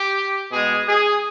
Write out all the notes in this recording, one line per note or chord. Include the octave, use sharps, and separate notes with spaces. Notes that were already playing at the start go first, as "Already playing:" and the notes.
Already playing: G4
B2 G#3 G#4
G#4